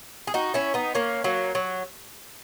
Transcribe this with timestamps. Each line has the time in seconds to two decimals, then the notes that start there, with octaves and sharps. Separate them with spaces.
0.27 G#4
0.34 D#4 F#4
0.54 C#4 E4
0.74 B3 D#4
0.95 A#3 C#4
1.24 F#3 A#3
1.55 F#3